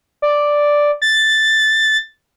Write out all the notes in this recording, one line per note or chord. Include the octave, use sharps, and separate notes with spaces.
D5
A6